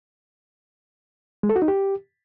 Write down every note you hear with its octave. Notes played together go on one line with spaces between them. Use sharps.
G#3
A4
F#4
D#4
G4